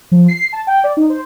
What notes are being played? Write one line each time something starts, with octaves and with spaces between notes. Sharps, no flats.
F3
C7
A5
G5
D5
D#4
C5